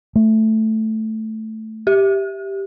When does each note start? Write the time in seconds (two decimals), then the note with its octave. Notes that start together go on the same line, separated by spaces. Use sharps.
0.16 A3
1.87 G4